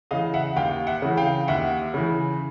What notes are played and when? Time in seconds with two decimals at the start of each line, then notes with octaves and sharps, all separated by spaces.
0.11 C#3 E3 D#5 F5
0.34 E5 F#5
0.56 D#2 F5 G5
0.87 E5 F#5
1.02 C#3 E3
1.17 F5 G5
1.48 D#2 E5 F#5
1.94 C#3 E3